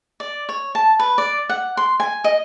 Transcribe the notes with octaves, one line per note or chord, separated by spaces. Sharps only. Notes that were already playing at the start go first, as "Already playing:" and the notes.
D5
C#5
A5
B4
D5
F#5
C6
G#5
D#5